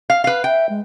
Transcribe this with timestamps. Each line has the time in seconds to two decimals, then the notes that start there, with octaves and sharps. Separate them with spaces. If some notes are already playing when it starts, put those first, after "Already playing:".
0.10 F5
0.24 B4 F5
0.44 E5 G5
0.69 G#3